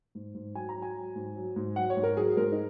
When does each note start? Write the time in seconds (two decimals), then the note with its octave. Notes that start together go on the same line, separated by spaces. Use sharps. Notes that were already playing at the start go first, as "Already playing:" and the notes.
0.15 G#2
0.35 G#2
0.55 F#3 G#5
0.69 A#5
0.75 F#3
0.82 G#5
0.95 F#3
1.16 G#2
1.36 F#3
1.56 G#2
1.76 F#3 F#5
1.90 C#5
1.97 G#2
2.03 A#4
2.17 F#3 G#4
2.37 G#2 A#4
2.52 D#4